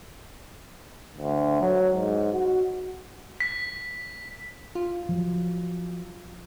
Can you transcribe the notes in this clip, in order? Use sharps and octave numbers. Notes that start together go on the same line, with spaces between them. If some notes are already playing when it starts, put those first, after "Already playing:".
D2
F#3
G#2
F#4
B6
F4
F3 F#3